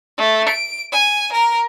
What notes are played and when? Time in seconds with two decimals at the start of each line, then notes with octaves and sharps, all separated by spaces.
0.18 A3
0.48 D7
0.92 G#5
1.32 A#4